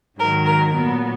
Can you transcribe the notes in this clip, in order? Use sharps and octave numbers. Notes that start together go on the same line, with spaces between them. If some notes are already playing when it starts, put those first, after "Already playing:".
G#2 D#3 F#3 A#4
A#4
A#2 F#3 B3